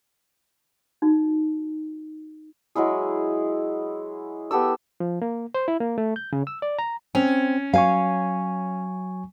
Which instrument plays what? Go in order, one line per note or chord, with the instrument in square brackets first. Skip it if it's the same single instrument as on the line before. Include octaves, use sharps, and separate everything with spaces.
[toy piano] D#4 F#4
[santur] F#3 G#3 E4 G#4
B3 G4 A4 E6
[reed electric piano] F3
A#3
C5
E4
A#3
A3
G6
C#3
E6
D5
A#5
[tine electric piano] C4 [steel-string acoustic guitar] C#4
[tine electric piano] F#3 G#5 C#6 [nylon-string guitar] F5